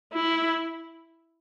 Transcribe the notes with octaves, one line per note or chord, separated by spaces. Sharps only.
E4